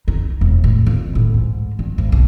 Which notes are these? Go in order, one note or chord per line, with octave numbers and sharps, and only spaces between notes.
D#4
E1
A2
F2
A2
G#2
G2
G#1
B1